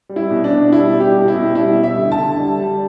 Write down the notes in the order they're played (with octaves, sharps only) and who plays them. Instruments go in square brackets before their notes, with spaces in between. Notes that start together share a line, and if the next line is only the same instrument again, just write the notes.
[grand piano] G3
E4
B2
D4
B2
G3 E4
G3
G4
B2
E4
B2
G3 E4
G3
E5
D3
A5
D3
G3
G3